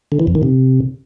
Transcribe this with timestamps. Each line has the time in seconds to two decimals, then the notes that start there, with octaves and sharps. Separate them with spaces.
0.12 D3
0.20 E3
0.27 F2
0.35 D#3
0.43 C3